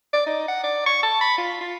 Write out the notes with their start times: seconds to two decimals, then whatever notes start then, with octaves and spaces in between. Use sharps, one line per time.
0.13 D5
0.26 D#4
0.48 F#5
0.64 D5
0.86 C#6
1.03 A5
1.21 B5
1.38 F4
1.61 F4